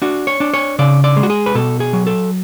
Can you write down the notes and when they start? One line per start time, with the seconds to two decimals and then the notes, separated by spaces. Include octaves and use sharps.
0.02 D4 F#4
0.27 C#5
0.40 D4
0.54 C#5
0.79 C#3 D5
1.04 D5
1.17 G#3
1.23 F#4
1.30 G#4
1.46 B4
1.55 B2 A4
1.80 G#4
1.93 F#3
2.07 A4